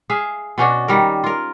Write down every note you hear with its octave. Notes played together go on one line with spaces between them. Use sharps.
G#4 E5 F5
B2 C#4 D4 F#4
D#3 G3 A#4
F4 A#4